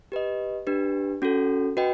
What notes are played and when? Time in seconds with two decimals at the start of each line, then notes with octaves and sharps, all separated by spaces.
0.12 G4 B4 D#5
0.67 D4 G4 B4
1.22 C#4 F#4 A4
1.77 F#4 B4 D#5 G5